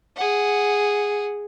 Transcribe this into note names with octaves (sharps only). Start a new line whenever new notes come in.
G#4 F#5